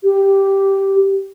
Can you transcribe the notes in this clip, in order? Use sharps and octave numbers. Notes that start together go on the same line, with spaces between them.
G4